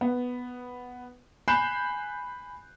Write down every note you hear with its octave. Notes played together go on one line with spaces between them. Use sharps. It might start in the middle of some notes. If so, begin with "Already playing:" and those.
B3
G#5 B5 F#6 G6 C7 E7